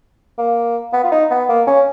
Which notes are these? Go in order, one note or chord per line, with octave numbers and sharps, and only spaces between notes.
A#3
B3
F4
D#4
B3
A#3
C#4